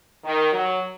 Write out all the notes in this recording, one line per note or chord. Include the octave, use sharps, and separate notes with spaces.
D#3
F#3